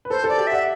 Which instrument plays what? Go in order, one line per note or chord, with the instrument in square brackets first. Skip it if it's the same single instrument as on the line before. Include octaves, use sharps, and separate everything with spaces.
[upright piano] B4
[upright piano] A4 [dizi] C5
[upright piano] A4 [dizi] D5
[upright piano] G4
[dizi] E5 [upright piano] F#5